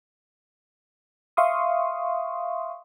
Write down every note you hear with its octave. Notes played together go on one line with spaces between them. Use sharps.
E5 F5 C6 C#6 D#6